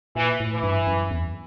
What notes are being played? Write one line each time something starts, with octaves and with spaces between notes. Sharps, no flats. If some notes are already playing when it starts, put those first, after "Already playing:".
A#2 E3
A2
E3
G2
F#2
E2